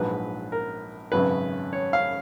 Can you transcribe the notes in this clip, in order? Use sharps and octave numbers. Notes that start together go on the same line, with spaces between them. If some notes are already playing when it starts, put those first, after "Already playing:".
Already playing: A#1 G#2 F#3 B4
A#4
G#1 F#2 C#3 B4
C#5
F5